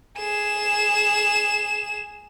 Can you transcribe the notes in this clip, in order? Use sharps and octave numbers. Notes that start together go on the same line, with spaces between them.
G#4 E7